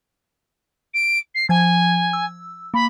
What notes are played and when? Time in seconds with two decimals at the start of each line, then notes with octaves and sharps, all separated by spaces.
0.94 D7
1.34 C7
1.49 F3 G#5 G#6
2.13 E6
2.74 A#3 B5